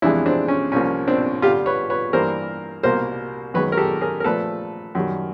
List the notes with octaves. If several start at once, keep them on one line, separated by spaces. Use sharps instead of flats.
F2 C3 E3 G#3 D4 E4
C4 D4
C#4
C2 C3 F3 A#3 C#4
C4 D4
G2 D3 G3 F4 G4
B4 C#5
B4 C#5
G2 E3 G3 A#3 A#4 C5
C2 B2 G3 A#3 A#4 C5
F#2 D#3 G#3 B4 C#5
A#4
G4 A4
G#4 A#4
A#4
A#2 F3 A3 A4 B4
F#2 D#3 G3